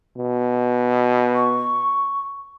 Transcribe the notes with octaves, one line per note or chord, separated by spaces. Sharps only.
B2
C#6